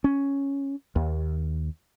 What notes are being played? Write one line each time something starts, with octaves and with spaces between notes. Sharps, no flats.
C#4
D#2